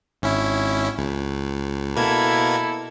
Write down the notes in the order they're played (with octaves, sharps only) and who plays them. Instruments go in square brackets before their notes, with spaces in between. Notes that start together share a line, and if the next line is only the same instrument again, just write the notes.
[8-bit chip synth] G#1 C#4 E4
C#2
[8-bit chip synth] B2 A#3 G#6 [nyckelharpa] E4 A4